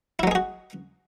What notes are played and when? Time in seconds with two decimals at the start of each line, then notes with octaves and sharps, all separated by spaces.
0.19 E4
0.23 F#3
0.27 G#3
0.31 G#4
0.35 F#4